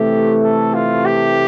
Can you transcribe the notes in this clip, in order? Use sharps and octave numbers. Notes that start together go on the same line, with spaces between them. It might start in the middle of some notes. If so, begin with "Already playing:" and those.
Already playing: C3 E3 A3 G4
A4
F4
G4